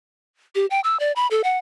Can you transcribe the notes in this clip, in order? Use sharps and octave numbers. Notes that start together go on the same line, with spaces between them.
G4
G5
E6
D5
B5
A4
F#5